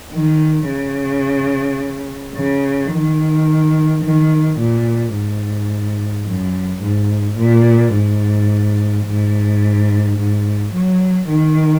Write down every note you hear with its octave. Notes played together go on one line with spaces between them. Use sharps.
D#3
C#3
C#3
D#3
D#3
A#2
G#2
F#2
G#2
A#2
G#2
G#2
G#2
F#3
D#3